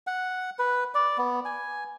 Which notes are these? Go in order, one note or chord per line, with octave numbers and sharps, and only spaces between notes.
F#5
B4
D5
B3
G#5